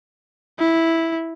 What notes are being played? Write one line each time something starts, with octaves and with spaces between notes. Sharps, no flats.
E4